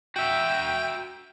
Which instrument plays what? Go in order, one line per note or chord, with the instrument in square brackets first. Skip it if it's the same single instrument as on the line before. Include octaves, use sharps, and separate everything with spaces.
[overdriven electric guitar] F#4 E5 [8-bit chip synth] G5